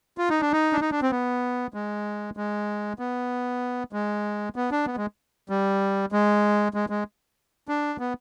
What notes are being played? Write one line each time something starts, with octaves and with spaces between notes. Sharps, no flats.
F4
D#4
D4
D#4
D4
D#4
D4
C4
B3
G#3
G#3
B3
G#3
B3
D4
B3
G#3
G3
G#3
G#3
G#3
D4
B3